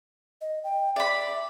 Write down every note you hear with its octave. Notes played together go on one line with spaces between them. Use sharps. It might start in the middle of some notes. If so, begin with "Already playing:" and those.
D#5
G5
D5 E5 B5